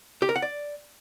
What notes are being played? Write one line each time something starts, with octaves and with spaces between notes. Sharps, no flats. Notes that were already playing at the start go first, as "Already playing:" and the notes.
G4
A#4
F#5
D5